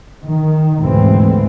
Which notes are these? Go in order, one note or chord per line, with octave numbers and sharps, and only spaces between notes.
D#3
D2 G#2 B2 D3 E3 C4